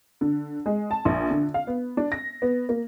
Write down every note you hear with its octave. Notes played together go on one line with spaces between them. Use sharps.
D3
G#3
A5
A#1
D3
F5
B3
D4
A#6
B3
A#3